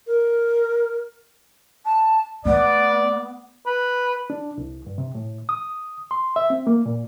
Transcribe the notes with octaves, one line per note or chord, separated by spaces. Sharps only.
A#4
A5
A3 B3 D5
B4
D4
C2
G2
C3
A2
D#6
C6
E5
C4
A#3
A#2